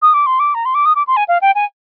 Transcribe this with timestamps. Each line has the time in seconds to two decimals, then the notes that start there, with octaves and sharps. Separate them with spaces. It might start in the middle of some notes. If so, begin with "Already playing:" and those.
0.02 D#6
0.14 D6
0.26 C6
0.40 D6
0.55 A#5
0.65 C6
0.75 D6
0.86 D#6
0.96 D6
1.07 C6
1.17 G#5
1.28 F5
1.42 G5
1.55 G#5